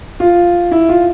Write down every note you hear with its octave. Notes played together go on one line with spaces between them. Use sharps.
F4
E4
F4